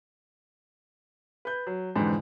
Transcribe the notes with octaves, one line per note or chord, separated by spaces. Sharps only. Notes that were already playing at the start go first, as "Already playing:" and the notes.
B4 G6
F#3
F2 G#2 D3 E3